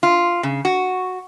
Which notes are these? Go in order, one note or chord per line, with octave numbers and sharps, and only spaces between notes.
F4
C#3
F#4